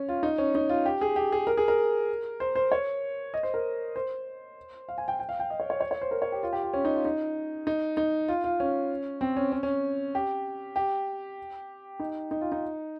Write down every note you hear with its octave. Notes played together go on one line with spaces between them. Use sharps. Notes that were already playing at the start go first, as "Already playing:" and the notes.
Already playing: C#4
F4
D#4
C#4
D#4
F4
G4
G#4
G4
G#4
A#4
G#4
A#4
C5
C5
C#5
D#5
C5
A#4
C5
F5
G#5
G5
G5
F5
G5
D#5
C#5
C#5
C#5
C#5
C5
A#4
C#5
G4
F4
G4
F4
C#4
D#4
F4
D#4
D#4
D#4
F4
F4
C#4
C4
C#4
C#4
C#4
G4
G4
D#4
D#4
F4
D#4